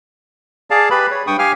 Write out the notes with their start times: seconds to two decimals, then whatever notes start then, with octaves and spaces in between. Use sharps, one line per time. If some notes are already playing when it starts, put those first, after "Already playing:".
0.71 G#4 D5 F5 A5
0.91 G4 B4 B5
1.11 C#5
1.27 G2 G5 C#6 D#6
1.39 G4 F5 G#5 F6